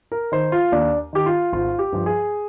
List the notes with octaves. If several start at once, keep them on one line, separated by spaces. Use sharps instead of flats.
A#4
D#3 C5
F4
D#2 D4
D#3 G4
F4
G#1 F4
G4
G2 F3
G#4